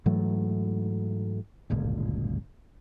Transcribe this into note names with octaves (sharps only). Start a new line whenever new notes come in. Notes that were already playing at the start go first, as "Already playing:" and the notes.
G#2 E3 F#3 A3
D1 G1 C#2 A#2